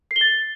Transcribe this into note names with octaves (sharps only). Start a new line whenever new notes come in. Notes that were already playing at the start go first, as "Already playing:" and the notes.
C7
G7
A6